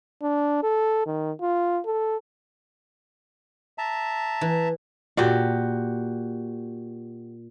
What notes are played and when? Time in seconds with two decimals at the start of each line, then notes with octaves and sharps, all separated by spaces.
0.22 D4
0.63 A4
1.06 D#3
1.41 F4
1.85 A4
3.78 E5 A5 A#5
4.41 E3
5.17 A#2 F#4 G4